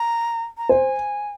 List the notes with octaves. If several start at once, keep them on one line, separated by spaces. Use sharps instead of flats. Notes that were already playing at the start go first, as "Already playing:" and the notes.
Already playing: A#5
A#5
C5 G#5